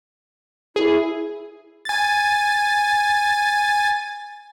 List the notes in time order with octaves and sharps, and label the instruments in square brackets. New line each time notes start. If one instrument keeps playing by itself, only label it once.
[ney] E4 [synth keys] G#4
[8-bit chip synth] G#5 A6